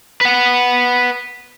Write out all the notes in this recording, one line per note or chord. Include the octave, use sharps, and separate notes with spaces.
B4 F#5